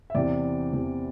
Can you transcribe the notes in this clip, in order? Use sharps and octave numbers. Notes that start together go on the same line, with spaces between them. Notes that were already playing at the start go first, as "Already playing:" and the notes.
E5
E2 C3 E3 D5
E2 C3 E3